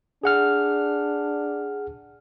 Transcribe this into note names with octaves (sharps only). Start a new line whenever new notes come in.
D4 G#4 F#5 F6